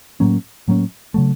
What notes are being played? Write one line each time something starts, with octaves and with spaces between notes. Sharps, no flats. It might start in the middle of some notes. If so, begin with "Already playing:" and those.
A2 F#3 A#3 C#4
A2 F#3 A#3 C#4
C#3 F#3 A3